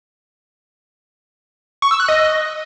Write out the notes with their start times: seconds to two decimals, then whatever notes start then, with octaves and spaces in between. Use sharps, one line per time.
1.82 C#6
1.91 E6
2.00 F#6
2.08 D#5